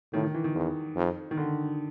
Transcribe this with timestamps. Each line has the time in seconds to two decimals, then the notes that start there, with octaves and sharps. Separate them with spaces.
0.13 A2 D#3
0.23 D#3
0.34 E3
0.44 D#3
0.55 E2
0.96 F2
1.31 D#3
1.37 D3